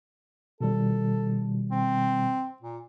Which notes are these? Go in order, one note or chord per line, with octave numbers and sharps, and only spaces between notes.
B2 D#3 G3 A4
C4
A#2